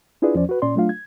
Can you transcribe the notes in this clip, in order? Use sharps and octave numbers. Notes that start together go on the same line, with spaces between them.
D4 E4 F4 G#4 B4 D5
E2 F3 C#4 C5 D5
F#4 B4
A#2 C#4 D5 C6
F#3 A3 D4 F4 F5
G#6